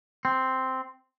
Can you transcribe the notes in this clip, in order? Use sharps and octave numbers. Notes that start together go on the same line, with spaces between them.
C4